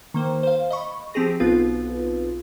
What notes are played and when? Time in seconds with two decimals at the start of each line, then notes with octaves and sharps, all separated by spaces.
0.14 D#3 A#3 C5
0.43 C5 F5
0.70 D#5 B5 C#6
1.14 F3 C4 G4 G#4 A#6
1.40 B1 B3 C4 F4 B4